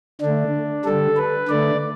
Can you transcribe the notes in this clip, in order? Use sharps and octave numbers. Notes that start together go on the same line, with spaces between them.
D3 A3 D4
D3 G3 A4
B4
D3 A3 D5